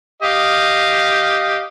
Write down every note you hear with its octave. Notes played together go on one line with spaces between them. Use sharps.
G4 D#5 F5